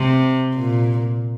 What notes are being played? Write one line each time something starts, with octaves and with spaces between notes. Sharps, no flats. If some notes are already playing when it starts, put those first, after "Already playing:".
Already playing: C3
A#2